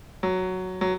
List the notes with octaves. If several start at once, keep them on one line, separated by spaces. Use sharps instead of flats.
F#3
F#3